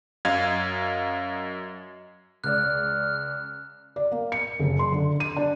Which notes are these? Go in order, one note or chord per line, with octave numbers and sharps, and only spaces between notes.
F#2 D#5 F5 G#6
C#2 D5 F6 F#6
D5
A#3
C#7
F#1
C6
D3
D#7
D4